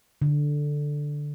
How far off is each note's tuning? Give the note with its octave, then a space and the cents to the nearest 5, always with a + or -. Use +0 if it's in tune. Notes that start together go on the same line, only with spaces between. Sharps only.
D3 +0